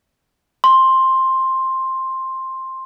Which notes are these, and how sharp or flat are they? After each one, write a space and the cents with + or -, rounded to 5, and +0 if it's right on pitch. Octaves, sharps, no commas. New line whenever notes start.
C6 +10